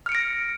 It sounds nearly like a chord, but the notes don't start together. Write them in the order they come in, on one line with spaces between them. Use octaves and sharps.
F6 C#7 D7 A#6